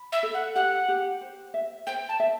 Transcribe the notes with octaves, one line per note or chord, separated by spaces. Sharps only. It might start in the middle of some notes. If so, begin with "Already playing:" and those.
Already playing: B5
E5
A4
F#5
G4 F#5
G4
C5
E5
C5 G5
A5
E5